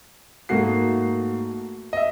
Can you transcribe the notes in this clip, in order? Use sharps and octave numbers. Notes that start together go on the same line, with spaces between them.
G#2 A3 A#3 F#4 C7
D#5 E5